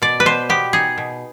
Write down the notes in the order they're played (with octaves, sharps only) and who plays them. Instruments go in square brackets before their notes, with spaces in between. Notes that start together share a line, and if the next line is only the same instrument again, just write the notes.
[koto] B2 D5
B4
B2 C5
B3 G4
D#4 G#4
B2